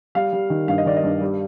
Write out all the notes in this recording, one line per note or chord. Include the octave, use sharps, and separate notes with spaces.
G3 F5
G3
D#3
G2 F5
D#5
D#3 D5
D#5
G2
G3